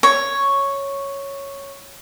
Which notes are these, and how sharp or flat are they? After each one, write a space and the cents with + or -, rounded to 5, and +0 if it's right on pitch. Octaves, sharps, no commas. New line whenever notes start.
C#5 +0